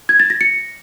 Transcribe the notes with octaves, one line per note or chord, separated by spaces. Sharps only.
G#6
A6
A#6
C#7